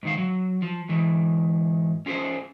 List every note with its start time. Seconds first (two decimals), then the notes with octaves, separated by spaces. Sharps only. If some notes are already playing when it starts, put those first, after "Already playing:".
0.03 G#2 D#3 F5
0.18 F#3
0.62 F3
0.89 G#2 E3
2.06 C#4 F4 G#4 B4 C5